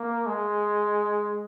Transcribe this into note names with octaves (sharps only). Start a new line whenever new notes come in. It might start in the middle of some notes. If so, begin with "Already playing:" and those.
Already playing: A#3
G#3